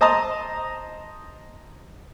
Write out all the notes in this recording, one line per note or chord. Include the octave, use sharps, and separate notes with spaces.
C5 D#5 A5 A#5 D#6